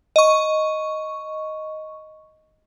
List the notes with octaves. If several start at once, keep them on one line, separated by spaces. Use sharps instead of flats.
D#5 C#6